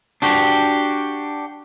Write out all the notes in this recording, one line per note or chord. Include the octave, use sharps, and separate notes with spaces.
D4 F#4 G4